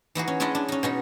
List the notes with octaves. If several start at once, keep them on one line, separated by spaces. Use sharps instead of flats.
E3 D#4 F#4 G#4
C#4
G#3 C#4 D4 E4 D5 D#5
D4
C#4 D#4
B2 C#4 D#4